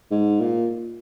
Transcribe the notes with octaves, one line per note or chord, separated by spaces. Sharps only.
G#2
A#2